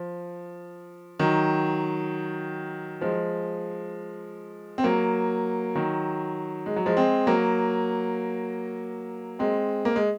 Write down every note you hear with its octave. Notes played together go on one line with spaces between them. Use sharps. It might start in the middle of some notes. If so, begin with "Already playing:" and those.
Already playing: F3
D#3 F#3
F3 G#3
C4
F#3 A#3
D#3 F#3
G#3
F#3
F3 G#3
G#3 C4
F#3 A#3
G#3 C4
A#3
G#3